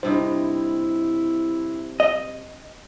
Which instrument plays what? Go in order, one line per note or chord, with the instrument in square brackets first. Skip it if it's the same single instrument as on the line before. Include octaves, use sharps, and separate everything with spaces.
[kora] G2 C3 D#4 [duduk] E4 [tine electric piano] C5
[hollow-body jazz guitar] D#5